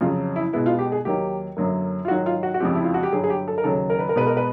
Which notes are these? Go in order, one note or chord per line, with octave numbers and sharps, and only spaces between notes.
F2 C#3 F#3 F4
E4
B2 G#3 B3 E4
F4
G4
G#4
D#2 D#3 F#3 A#3 G4
F#2 D3 F#3 A#3
F4
G#2 D#3 F#3 F#4
F4
F#4
F#4
F2 C#3 F3 G#3 C4 G4
E4
F4
F#4
G4
G2 D3 F#3 G#4
G#4
G4
A4
A#4
D#2 C#3 F#3 A4
A#4
B4
A#4
B2 G#3 B3 B4
A#4
B4